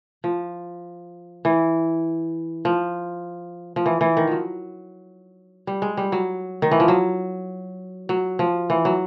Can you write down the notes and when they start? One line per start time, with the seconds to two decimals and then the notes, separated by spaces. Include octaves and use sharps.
0.24 F3
1.45 E3
2.65 F3
3.76 F3
3.86 E3
4.01 E3
4.17 D#3
4.27 F3 F#3
5.67 G3
5.82 G#3
5.97 G3
6.12 F#3
6.62 D#3
6.71 E3
6.80 F3
6.88 F#3
8.09 F#3
8.39 F3
8.70 E3
8.85 F#3